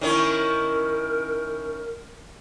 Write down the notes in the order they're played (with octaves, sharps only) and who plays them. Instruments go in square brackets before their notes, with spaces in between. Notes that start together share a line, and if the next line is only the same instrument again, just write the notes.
[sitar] D#3 C#4 E4 [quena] A#4